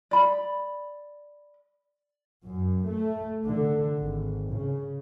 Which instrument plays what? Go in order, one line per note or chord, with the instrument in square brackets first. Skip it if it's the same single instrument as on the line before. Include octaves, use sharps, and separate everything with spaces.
[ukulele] D5 B5
[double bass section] F#2
A3
D3
G#1
C#3